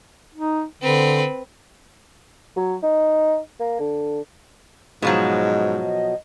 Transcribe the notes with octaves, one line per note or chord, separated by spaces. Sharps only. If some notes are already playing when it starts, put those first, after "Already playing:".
D#4
D3 C4 B4
F#3
D#4
A#3
D3
G#2 B2 F3 F#3 D#5